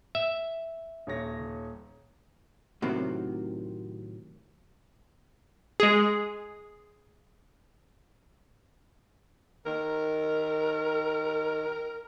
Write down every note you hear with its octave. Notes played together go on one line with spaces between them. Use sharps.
E5
D#1 C#5 A#6
A2 C3 D#3 F#3 C4
G#3 G#4
D#3 A#4